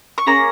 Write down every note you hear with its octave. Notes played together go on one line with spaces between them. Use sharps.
C#6
A#3 C#4 G#4 A#5